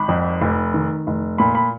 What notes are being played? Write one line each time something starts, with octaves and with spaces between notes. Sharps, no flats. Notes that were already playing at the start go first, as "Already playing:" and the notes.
Already playing: G#1 B5
F2
F1
D#3
F1
A#2 B5
B5